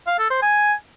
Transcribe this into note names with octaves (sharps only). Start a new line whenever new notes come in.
F5
A4
C5
G#5